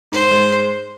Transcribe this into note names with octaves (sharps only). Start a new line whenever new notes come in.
G#2 C5
G#3